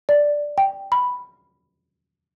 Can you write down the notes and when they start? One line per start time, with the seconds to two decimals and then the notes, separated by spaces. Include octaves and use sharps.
0.09 D5
0.58 G5
0.92 B5